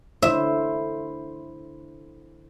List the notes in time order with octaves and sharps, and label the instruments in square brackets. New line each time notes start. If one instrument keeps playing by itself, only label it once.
[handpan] D3 E4 C5 [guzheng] E5